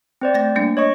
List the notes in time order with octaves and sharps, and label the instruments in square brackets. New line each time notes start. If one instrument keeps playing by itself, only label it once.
[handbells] C4 C5 D5
[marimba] A3 A#6
G3 A#3 D4
[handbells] C#5 D#5 C#6